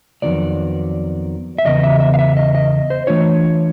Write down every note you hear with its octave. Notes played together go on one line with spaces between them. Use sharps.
F2 C3 D#3 F#3 B3 D5
E5
E2 C#3 B3 D#5
E5
E5
F5
E5
D#5
D#5
C5
E3 A3 D4 F4 C#5